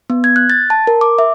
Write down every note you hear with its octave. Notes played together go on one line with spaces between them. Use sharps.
B3
G#6
F#6
A6
A5
A#4
D6
E5